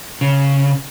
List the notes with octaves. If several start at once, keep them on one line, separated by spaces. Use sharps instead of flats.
C#3